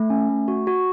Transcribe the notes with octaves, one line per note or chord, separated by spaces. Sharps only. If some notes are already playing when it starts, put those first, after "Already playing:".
Already playing: A3
C#4
A3
F#4
F#4